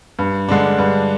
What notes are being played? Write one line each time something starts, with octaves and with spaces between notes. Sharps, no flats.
G2
D3 G#3 D4
G2